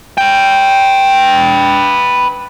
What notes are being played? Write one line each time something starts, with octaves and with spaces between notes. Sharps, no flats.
B4 G5